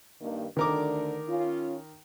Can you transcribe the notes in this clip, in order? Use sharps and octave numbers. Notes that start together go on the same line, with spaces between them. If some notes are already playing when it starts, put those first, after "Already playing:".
G2 D#3 A#3
D2 D3 D#3 D4 A#4 D6
C#4 F4